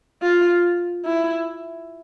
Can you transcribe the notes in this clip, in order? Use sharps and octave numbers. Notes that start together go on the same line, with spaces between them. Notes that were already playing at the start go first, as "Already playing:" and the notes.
F4
E4